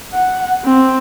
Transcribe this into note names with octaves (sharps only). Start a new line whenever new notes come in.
F#5
C4